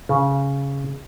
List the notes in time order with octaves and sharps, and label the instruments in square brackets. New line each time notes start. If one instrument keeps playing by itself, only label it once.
[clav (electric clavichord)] C#3